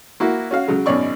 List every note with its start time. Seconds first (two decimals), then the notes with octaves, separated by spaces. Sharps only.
0.20 A#3 E4 F#4
0.51 C#4 F#4 F5
0.68 C#3 F#3 G#3
0.86 G#1 F#2 B2 C#5 D5 C#6